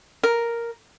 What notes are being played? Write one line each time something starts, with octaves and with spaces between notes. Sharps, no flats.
A#4